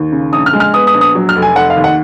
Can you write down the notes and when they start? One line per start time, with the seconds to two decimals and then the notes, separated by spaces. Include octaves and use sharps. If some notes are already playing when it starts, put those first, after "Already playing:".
Already playing: D#2
0.12 C#3
0.33 A#1 D#6
0.46 F6
0.53 G#3
0.60 F6
0.74 B3 D#6
0.87 D#6
0.94 A#1
1.01 D#6
1.15 F#3
1.29 F6
1.36 F1
1.42 G#5
1.56 F1 F#5
1.70 F5
1.77 D#2
1.84 F#5